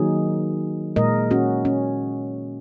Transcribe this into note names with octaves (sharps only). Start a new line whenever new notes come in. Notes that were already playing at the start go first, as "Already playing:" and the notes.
Already playing: D#3 F#3 A#3 D#4 G#4
A#2 G#3 A#4 D#5
C#4 F#4
C#4